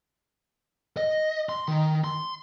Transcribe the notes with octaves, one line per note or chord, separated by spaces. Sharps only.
D#5
C6
D#3
C6